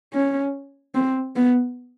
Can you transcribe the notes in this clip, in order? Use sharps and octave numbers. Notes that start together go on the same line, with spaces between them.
C#4
C4
B3